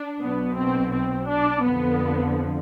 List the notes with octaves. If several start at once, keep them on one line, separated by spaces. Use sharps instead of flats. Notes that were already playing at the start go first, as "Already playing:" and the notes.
Already playing: D4
B1 B2 B3
C4
C4
D4
F2 D3 F3 B3